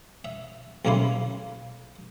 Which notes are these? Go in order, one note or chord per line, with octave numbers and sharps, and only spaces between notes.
E5
B1 C#3 A#3 E4 C6